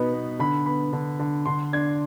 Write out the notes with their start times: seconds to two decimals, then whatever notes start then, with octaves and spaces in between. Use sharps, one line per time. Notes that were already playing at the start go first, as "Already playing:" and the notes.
Already playing: B2 B3 D#4 B5
0.12 B3
0.39 D3 B5
0.66 B3 B5
0.93 D3
1.19 D3
1.46 D3 C6
1.73 D4 G#6